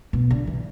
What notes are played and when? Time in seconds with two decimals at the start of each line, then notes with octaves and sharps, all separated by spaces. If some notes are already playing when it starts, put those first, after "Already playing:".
0.13 B2
0.31 D3
0.47 E3